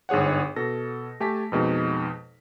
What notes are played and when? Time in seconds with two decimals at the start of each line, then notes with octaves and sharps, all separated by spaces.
0.09 G1 G#2 G#4 C#5 F#5
0.56 B2 A4 A#6
1.20 A3 G4 G#5 A5 B6
1.52 F2 B2 G#3 D#4